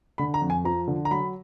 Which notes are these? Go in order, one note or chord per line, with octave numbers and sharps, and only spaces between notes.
D3 B5
A#5
F2
G#5
F3 A#5
D3
A#5
F#3 B5